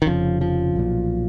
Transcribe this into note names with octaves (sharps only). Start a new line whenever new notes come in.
D#3
F1 F2 C#3 F3
F3
B1 A#2